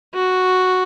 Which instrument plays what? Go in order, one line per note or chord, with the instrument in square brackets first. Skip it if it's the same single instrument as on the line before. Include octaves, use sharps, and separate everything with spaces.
[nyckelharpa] F#4